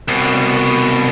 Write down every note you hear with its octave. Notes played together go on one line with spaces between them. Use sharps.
C2 B2